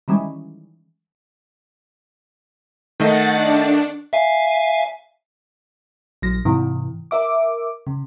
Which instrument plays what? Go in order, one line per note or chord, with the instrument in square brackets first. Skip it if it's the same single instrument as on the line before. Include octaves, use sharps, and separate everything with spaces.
[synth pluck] D#3 E3 G3 G#3 C#4
[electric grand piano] D#3 A3 D#5 [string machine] F#5 A6
[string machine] D4
[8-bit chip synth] E5 F5 G#5
[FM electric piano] A#1 F#3 A#6
G#2 C3 E3
A#4 E5 D6
C#3